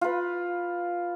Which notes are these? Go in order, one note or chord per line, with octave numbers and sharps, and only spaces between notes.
F4 B4